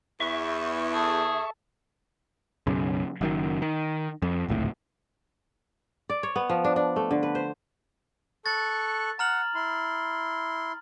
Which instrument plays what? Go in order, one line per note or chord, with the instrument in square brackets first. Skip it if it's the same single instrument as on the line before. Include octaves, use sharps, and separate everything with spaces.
[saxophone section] E2 [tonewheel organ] E5 C#6
[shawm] G#4 [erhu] A4
[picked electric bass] B1 F#2 C#3
F#1 F#2 D#3
D#3
F2
D1 G#1 C#2 A2
[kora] D5
C#5
B3
F3
D4
D4
A3
D3
B4
C5
[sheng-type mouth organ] A4 C#6 F#6 [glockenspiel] A6
[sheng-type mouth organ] F#5 [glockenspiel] A#5 F6 F#7
[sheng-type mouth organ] E4 C6